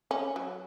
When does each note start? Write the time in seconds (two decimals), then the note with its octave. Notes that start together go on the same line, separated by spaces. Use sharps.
0.11 C#4
0.36 F#3